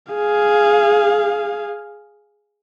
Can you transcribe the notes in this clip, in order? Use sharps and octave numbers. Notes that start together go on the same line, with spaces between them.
G#4 F5